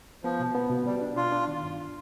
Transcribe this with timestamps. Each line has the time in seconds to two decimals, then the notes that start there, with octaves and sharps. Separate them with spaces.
0.24 F3 B3
0.40 B2
0.55 B3
0.70 B2
0.86 B2 G3
1.01 D4
1.17 D4 F4
1.32 D4
1.48 D#3
1.63 G2